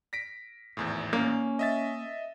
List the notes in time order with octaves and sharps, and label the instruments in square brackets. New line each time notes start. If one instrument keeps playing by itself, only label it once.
[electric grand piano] A#6 B6 D7
G#1 E2 A2
[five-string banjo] A#3 [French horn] C#4
[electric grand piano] D#5 E5 A6